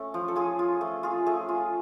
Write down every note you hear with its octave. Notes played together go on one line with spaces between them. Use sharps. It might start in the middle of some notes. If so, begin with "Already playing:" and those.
Already playing: A3 C#4
F3
A4
F4 G#4
F4
A3
F4 G#4
A3 G#4
F4